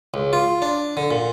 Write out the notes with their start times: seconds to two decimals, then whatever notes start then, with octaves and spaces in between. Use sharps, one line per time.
0.14 C#2
0.33 F4
0.62 D4
0.97 D3
1.11 A#2